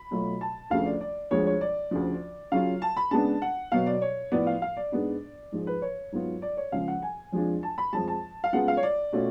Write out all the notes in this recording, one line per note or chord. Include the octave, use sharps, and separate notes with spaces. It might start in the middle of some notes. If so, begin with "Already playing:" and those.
Already playing: B5
B2 F#3 A3 F4
A5
D2 C#3 F3 A3 F5
D5
D5
D2 D3 F3 G#3 C#5
C#5
D5
D2 C#3 F3
C#3 F#3 C#4 F4 F5
A5
B5
C#3 G#3 B3 D4 A5
F#5
B2 F#3 B3 F5
D5
C#5
A2 F3 B3 D5
F5
F5
D5
G#2 G#3 B3 D4
G#2 F3 G#3
B4
C#5
G#2 F#3 B3 F4
D5
C#5
C#2 C#3 F3 F5
F#5
G#5
F2 F3 G#3 D4 F4
A5
B5
F2 F3 G#3 A5
A5
F5
C#3 G#3 B3 F4 F#5
F5
C#5
D5
B2 A3 C#4 F4